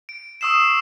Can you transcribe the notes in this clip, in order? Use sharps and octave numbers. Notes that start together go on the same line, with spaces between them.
D7
C#6 D#6 E6 C7 E7